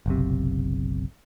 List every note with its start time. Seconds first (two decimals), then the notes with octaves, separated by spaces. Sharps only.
0.06 F#1 B1 C3